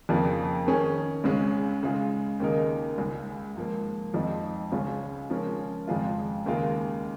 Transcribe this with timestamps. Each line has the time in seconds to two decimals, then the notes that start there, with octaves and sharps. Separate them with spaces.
0.09 F2 C#3 F3 A#3
0.67 D#3 C#4 G#4
1.24 C#2 C#3 G#3 C#4
1.83 C#3 G#3 F4 G#4
2.40 D#2 C#3 A#3 D#4 A#4
2.98 C#2 C#3 G#3
3.56 G#2 F3 A#3
4.14 F2 F3 G#3 D#4
4.72 C#2 C#3 G#3 C#4 F4
5.30 C#3 F3 G#3 C#4 A#4
5.87 F2 C#3 F3 G#3 F4
6.46 D#2 C#3 G#3 F4 A#4